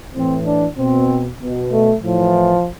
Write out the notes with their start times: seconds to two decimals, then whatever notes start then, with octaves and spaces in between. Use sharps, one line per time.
0.15 A2 E3 C4
0.46 D4
0.77 B2 C4
1.40 B2
1.72 A3
2.03 A2 E3 F3